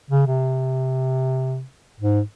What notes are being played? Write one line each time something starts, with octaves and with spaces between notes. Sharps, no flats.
C#3
C3
G#2